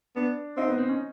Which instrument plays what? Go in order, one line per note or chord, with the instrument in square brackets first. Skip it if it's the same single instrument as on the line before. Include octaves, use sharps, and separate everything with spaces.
[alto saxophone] B3 [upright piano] D4
[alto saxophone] C4 [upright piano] D#4
[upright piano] B3
C4
C#4